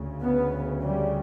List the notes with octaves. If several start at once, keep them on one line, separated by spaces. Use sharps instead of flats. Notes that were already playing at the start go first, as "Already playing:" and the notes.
Already playing: D2 C#3
B3
G3